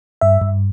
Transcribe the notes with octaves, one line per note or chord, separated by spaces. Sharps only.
G2 E5
G2